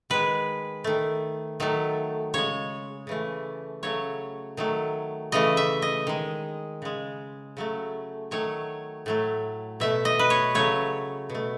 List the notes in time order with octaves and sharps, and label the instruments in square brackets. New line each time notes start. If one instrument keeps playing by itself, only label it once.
[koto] D#3 G#3 B4
D#3 A3
D#3 F#3 A3
C#3 G#3 C#5
C#3 E3 A3
C#3 F#3 A3 C#5
D#3 F#3 A3
C#3 E3 A3 D#5
E5
D#5
D#3 G#3
C#3 G#3
C#3 F#3 A3
D#3 F#3 A3 C#5
A2 F#3 A3
B2 A3 E5
D#5
B4
C#5
C#3 F#3 A3 C#5
B2
A3